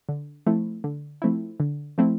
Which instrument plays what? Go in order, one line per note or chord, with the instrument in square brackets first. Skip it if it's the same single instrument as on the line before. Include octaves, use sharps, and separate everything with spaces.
[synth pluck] D3
F3 A3 C4 E4
D3
F3 A3 C4 E4
D3
F3 A3 C4 E4